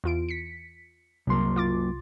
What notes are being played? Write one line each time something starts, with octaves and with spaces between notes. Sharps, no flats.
E2 F4 D7
B6 C#7
C2 F#2 F#3 A#3 C6
F4 D6 A6